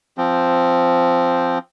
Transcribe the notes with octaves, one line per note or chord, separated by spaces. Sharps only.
F3 C4